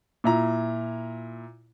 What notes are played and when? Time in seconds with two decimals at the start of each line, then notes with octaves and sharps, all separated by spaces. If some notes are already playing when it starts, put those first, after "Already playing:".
0.24 A#2 E4 A#5